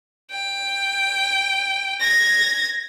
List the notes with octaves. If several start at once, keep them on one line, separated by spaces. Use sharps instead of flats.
G5
G#6 A#6